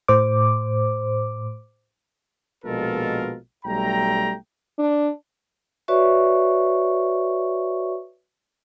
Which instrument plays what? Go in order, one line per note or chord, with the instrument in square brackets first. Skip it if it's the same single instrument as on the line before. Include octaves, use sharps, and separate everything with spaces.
[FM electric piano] A2 C5 D6
[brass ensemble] A#1 B2 G#3 F4 A4 A#4
B1 G3 A3 G5 A#5
[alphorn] D4
[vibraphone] F#4 B4 C#5 D5 E5 C#6